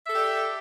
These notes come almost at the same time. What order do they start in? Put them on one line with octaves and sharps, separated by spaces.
E5 A4 G4 D5